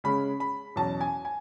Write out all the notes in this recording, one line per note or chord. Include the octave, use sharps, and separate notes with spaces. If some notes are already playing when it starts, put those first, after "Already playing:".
C#3 G#3 C#4 B5
B5
E2 B2 F#3 C#4 A5
G#5
G#5